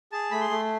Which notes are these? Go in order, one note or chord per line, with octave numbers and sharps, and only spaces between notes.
G#4 A5
A3 B5
C6
A3